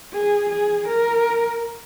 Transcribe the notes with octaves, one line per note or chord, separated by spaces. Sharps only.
G#4
G#4
A#4